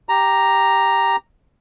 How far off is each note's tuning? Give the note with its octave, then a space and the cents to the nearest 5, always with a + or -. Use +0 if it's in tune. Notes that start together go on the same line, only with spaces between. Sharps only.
G4 +0 A#5 +0